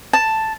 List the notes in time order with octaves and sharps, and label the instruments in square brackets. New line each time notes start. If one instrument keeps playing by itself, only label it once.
[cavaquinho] A5